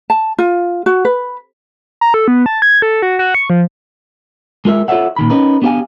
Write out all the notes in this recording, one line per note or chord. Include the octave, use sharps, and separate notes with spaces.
A5
F4
F#4
B4
A#5
A4
B3
A5
G#6
A4
F#4
F#4
C#6
F3
G#3 F4 A#4 E5
F4 A4 C#5 D5 E5 F#5
A#2 D#3 B5
C#4 D#4 A#4 B4
B3 D4 G4 B4 F5 G#5